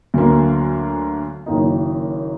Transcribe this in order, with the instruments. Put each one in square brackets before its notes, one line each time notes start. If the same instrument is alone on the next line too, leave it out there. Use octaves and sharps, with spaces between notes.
[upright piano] D2 D3 F#3 A#3
F#1 F#2 D#3 A#3 D#4